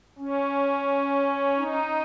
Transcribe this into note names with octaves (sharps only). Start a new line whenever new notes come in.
C#4
D#4